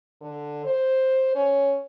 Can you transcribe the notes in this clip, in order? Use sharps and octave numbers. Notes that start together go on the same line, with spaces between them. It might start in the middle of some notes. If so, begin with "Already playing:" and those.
D3
C5
C#4